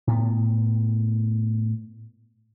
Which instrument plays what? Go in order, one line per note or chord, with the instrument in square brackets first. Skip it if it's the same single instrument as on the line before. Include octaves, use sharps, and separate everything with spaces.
[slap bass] A2 B3